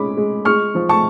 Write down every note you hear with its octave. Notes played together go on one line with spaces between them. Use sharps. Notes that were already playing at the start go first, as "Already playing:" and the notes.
Already playing: G#3 C#4 B5 D6
G#3
G#3 C#6 F6
F3
A5 C#6